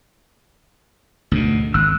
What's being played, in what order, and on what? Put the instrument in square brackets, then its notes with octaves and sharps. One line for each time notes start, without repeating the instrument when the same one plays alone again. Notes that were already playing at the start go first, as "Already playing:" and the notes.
[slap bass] D2 G#2 B2
[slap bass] G#1 [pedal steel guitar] E6 F#6